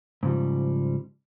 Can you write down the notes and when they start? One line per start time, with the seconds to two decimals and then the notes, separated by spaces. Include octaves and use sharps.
0.23 G#2 C#3 F3 G3